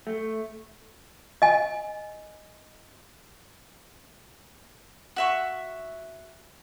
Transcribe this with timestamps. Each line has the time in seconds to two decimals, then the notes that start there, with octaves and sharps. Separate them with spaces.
0.07 A3
1.42 D#5 G#5
5.16 F#4 E5 C#6